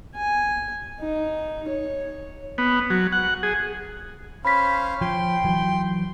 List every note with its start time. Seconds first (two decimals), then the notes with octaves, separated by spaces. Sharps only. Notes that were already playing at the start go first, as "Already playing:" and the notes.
0.15 G#5
1.01 D#4
1.69 C#5
2.58 B3
2.90 F#3
3.12 F#5
3.43 G#4
4.45 C#4 C5 F5 B5 B6
5.02 F3 G5 C6
5.45 E3 F#3